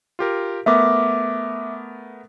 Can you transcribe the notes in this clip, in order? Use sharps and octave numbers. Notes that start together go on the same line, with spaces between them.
F4 G4 A#4
A3 B3 A#4 E5 D6